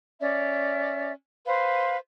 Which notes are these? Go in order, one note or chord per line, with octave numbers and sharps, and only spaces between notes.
C#4 D5 E5
B4 C5 F5